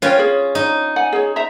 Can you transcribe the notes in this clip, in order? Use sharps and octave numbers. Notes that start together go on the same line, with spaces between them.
C#4 F4 B4 G5
G#4
D#4
F#5 G#5
G#4 C#5
C5 E5 A#5